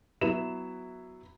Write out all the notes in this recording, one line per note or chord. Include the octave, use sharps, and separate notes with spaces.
F#3 B3 E4 E7